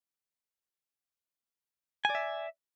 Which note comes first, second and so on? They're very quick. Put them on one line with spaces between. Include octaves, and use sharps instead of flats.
G#5 D5 E5